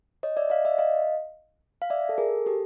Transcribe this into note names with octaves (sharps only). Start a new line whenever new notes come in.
C#5 D#5
D5 E5
D#5 F5
D5 E5
D#5 F5
F5
D5 E5
A4
G#4 A#4
G4 A4